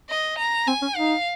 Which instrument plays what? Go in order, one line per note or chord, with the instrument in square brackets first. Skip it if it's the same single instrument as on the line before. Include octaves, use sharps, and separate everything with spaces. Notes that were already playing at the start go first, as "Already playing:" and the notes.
[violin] D#5
A#5
[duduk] C4 [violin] G#5
[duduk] C#4
[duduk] D#4 [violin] F5